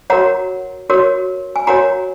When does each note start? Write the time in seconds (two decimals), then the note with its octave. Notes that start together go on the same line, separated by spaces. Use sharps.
0.10 F#4 A#4 C#5 F#5 A#5
0.90 F#4 A#4 C#5
1.56 G#5
1.67 F#4 A#4 C#5 F#5 A#5